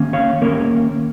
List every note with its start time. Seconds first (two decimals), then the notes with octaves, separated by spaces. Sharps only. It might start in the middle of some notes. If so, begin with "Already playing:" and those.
Already playing: D#3 A#3 C#4
0.13 C#5 F5
0.42 D#3 A#3 C#4 A#4 C#5